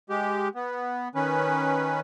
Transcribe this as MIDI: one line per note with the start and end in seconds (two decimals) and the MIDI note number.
0.10 0.49 56
0.10 0.49 67
0.55 1.08 59
1.15 2.00 51
1.15 2.00 61
1.15 2.00 71